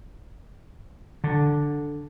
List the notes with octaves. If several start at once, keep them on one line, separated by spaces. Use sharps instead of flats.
D3